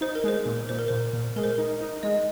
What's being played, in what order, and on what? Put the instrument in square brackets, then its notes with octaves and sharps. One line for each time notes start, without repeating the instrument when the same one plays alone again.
[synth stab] D#4 [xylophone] C5
[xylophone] A#4
[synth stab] G#3 [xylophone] C5
[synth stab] A#2
[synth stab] A#2 [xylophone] C5
[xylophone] A#4
[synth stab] A#2 [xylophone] C5
[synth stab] A#2
[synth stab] G#3 [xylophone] A#4
[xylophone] C5
A#4
[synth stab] D#4
D#4
[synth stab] G#3 [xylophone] D#5